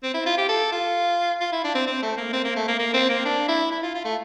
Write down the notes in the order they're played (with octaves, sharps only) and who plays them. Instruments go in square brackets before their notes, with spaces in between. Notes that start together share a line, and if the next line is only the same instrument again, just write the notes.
[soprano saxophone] C4
E4
F4
G4
A4
F4
F4
E4
D4
C4
C4
A3
A#3
C4
A#3
A3
A#3
A#3
C4
A#3
D4
E4
E4
F4
F4
A3